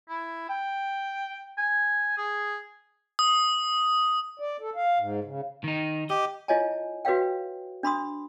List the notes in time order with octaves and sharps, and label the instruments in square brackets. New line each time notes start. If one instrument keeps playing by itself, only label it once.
[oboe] E4
G5
G#5
G#4
[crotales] D#6
[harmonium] D5
A4
F5
G#2
C#3
[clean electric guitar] D#3 D#4
[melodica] G4 [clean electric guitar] D#5
[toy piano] E4 F4 C#5 D#5 G#5 A5
F#4 B4 C#5 F5 G5
D4 B5 C6 D#6